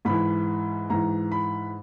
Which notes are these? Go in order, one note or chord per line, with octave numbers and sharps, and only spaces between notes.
G#2 E3 B5
G#2 E3 A#5
B5